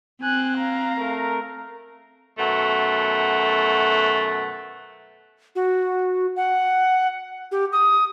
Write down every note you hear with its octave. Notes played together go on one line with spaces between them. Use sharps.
C4 G#5 F#6
F5 A#5
A3 A#4
F#2 B2 A3 F#5
F#4
F#5
G4
D#6